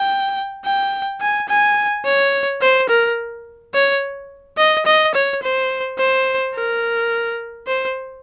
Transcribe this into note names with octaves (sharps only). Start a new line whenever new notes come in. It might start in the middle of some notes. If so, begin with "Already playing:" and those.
Already playing: G5
G5
G#5
G#5
C#5
C5
A#4
C#5
D#5
D#5
C#5
C5
C5
A#4
C5